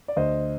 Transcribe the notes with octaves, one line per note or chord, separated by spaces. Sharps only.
D5
D2 C5 D#5